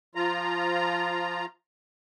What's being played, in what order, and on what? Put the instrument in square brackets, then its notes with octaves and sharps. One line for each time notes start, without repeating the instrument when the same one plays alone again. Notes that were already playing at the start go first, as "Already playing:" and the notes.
[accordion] F3 F4 A#5